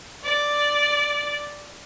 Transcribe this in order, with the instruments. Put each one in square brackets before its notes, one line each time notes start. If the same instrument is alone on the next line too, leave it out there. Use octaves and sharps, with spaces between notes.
[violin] D5